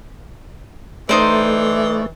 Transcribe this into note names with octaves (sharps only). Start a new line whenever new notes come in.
E3 A3 D#4 C5 D5